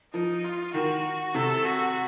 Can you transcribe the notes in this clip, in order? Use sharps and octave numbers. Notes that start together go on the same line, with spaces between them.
F3 D#4
F4
D#3 F#4
C3 A4
F#4